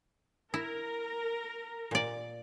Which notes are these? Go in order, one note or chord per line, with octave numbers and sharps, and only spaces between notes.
E4 A#4
A#2 D5